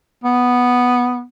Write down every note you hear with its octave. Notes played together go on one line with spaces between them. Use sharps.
B3